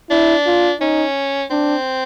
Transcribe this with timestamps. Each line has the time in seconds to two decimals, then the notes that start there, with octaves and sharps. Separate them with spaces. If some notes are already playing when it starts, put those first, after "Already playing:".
0.10 D4 E4
0.46 F4
0.81 C#4 D#4
1.50 C4 D4